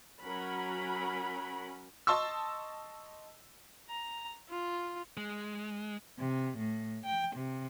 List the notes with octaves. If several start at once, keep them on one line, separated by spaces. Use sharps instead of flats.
F#3 C#4 A#4 F#5 B5
D#5 A5 C6 C#6 E6
A#5
F4
G#3
C3
A2
G5
C3